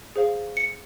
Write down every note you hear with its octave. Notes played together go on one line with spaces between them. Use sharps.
G#4 C5 F5
C#7